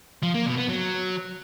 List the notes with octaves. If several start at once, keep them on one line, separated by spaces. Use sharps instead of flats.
F3
A#3
B2
B3
F#3